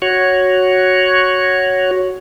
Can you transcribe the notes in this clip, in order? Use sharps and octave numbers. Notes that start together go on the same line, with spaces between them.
F#4 C#5